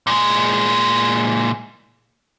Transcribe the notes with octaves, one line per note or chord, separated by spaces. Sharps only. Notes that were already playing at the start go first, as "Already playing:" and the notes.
A#2 G#3